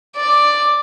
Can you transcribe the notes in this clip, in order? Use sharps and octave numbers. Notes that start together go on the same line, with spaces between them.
D5